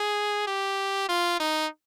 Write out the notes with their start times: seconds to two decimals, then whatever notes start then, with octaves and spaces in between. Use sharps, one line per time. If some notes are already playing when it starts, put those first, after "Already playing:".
Already playing: G#4
0.47 G4
1.09 F4
1.40 D#4